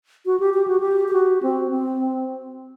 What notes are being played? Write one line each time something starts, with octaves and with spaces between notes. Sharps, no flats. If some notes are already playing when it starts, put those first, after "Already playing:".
F#4
G4
G4
F#4
G4
G4
F#4
C4
C4